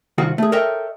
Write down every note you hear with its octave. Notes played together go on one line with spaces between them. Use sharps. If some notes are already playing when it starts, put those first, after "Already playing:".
C2 D#3 F4 F#4 F#5
A3 G#4
A4 A#4 C#5 D#5 E5 G5